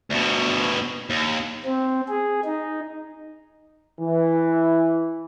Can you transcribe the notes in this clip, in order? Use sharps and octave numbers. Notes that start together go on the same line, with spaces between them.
D2 B2
D#2
C4
G#4
D#4
E3